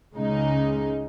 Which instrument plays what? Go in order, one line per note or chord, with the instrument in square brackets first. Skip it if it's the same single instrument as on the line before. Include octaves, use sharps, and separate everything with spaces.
[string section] C#2 C#3 G#3 D#4